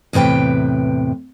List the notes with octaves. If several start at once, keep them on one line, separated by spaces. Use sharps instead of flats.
E2 A2 C3 B4 G5